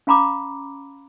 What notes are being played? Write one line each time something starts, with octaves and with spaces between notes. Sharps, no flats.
C#4 F5 A#5 B5 D6